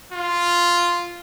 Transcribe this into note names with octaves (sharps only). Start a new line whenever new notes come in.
F4